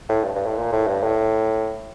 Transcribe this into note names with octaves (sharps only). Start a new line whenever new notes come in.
A2
G2
G2
A2
A#2
A2
G2
A2